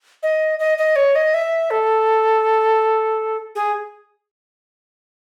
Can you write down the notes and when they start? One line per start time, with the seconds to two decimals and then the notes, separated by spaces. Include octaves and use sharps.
0.23 D#5
0.59 D#5
0.78 D#5
0.96 C#5
1.15 D#5
1.34 E5
1.71 A4
3.55 G#4